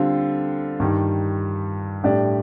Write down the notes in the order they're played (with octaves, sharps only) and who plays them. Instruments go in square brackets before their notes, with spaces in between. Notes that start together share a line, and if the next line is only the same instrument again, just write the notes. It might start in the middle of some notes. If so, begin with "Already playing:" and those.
Already playing: [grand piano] D3 G3 C4 F4
G2 D#3 G3
A2 G3 D4 G4 D5